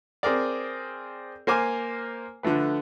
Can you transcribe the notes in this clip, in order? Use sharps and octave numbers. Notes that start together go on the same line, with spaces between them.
C4 G#4 A#4 D5
A#3 C5 G#5 D6 F6
D3 F3 A3 B4